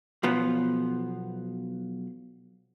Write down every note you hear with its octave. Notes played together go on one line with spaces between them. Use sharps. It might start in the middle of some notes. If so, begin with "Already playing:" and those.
B1 F3 B3